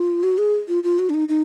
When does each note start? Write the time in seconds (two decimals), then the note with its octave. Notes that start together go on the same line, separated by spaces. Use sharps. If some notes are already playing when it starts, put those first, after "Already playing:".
Already playing: F4
0.23 F#4
0.38 G#4
0.68 F4
0.84 F4
0.99 F#4
1.10 D4
1.14 D#4
1.29 D#4